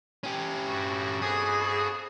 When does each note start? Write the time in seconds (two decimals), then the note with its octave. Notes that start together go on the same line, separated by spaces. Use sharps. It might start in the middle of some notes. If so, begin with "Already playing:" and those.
0.24 C#4 G4
0.67 G2 F#4
1.22 F2 B3 G#4 D#6